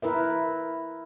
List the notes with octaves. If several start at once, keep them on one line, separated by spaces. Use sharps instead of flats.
E4 A#4 B4 E5